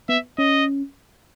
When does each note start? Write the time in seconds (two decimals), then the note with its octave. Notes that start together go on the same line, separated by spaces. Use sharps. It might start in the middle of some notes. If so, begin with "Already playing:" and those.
0.09 B3 E5
0.38 C#4 D#5